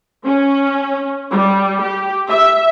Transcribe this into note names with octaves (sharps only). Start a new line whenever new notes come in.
C#4
G3
G4
E5